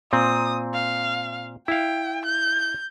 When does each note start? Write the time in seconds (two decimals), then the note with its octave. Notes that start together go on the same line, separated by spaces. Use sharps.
0.13 A#2 C4 D#6
0.74 F5
1.68 E4 F5 G5
2.26 G6